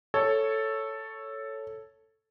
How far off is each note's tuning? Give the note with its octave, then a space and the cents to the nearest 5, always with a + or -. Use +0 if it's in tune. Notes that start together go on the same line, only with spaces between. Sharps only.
A4 +0 C#5 +0